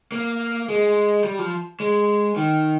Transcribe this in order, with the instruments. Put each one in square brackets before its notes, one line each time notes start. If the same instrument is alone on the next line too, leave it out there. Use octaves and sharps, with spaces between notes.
[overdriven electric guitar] A#3
G#3
G3
F3
G#3
D#3